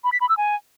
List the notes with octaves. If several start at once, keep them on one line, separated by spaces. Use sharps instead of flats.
B5
B6
B5
E6
G#5